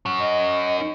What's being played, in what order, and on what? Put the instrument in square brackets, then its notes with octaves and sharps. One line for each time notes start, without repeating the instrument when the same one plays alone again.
[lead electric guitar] C#4 F#4
[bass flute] D#5
D#4